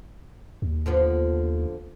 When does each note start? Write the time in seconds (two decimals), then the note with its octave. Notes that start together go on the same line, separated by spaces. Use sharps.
0.62 D#2
0.86 D3 F3 B3